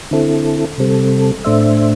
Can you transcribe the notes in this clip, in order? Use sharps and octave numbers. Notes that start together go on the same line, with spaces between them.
D3 C4 E4 A4
C3 G3 C4 A4
A2 A3 D4 C5 E5